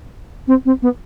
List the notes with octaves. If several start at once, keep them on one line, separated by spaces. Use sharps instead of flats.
C4
C4
B3